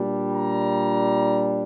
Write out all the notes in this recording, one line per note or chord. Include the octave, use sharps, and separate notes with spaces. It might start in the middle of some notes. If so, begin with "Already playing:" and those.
Already playing: A#2 G3 D4
A#5